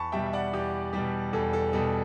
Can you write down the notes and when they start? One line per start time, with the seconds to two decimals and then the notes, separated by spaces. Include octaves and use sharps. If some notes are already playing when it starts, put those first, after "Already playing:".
Already playing: E2 A5 B5 C#6
0.12 B2 G3 E5 G5
0.26 E5
0.33 D5 F#5
0.53 E2 G4
0.93 B2 G3 G4
1.33 E2 A4
1.53 A4
1.73 B2 G3 A4